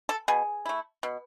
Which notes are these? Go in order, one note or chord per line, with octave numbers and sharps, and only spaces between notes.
A4
B2 G#4
A3 E4
B2